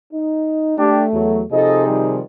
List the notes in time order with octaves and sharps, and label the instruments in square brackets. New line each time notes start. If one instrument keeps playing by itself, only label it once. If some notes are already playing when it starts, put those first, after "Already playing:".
[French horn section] D#4
[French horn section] A3 [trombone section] D4 G4
[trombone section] E2 F#3
[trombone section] C3 D#4 G#4 [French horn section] F3 A4 D#5
[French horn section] D#3 F3 G3